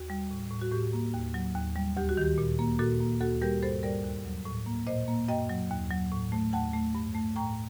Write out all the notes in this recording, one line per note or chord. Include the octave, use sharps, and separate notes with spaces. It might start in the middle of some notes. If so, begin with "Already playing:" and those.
Already playing: D#2 F#4
G3
A2
A2
F#4
A2 G4
A#3
D#2
F#3
D#2
G3
D2 G4
F#4
D#3 G4
A#2
A#3
A#2 F#4 A4
A#3
D2 F#4 A4
G3 G4 A#4
G2 A4 C5
G3 A#4 D5
D#2
F#3
A2
A#3
A#2 C5 D#5
A#3
F#2 D#5 G5
F#3
D#2
F#3
A2
A3
D#2 F#5 A5
A3
G2
A3
A2 G5 A#5